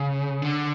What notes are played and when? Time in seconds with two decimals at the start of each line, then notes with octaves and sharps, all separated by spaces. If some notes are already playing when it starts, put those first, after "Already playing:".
Already playing: C#3
0.42 D3